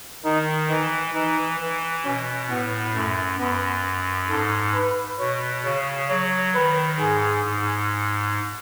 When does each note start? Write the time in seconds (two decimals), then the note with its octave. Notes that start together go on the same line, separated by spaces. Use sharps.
0.25 D#3 D#4
0.69 E3 D#4
1.14 E3 D#4
1.60 E3
2.05 B2 C#4
2.50 A2 B3
2.94 F#2 A3
3.39 F#2 B3
4.29 G#2 A4
4.75 B4
5.19 B2 C#5
5.64 C#3 C#5
6.09 F#3 C#5
6.55 D#3 B4
6.99 G#2 G#4
7.45 G#2